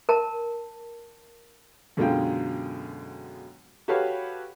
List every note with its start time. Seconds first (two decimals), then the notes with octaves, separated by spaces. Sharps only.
0.09 A#4 A5
1.97 F#2 B2 D3 G#3 F4 G5
3.88 F#4 G4 A4 B4 C#5 F5